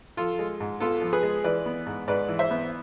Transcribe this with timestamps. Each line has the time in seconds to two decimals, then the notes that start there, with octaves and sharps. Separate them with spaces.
0.17 F3 F4 A4
0.39 G#3
0.60 G#2
0.80 B3 F4 A4
1.02 F3
1.13 G#4 B4
1.23 G#3
1.44 E3 B4 D5
1.66 B3
1.86 G#2
2.08 G#2 B4 D5
2.28 E3
2.39 C5 E5
2.51 B3